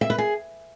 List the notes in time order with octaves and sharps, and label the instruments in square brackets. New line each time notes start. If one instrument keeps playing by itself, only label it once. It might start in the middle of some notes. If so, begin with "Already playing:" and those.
[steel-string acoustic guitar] E5
B4
G#4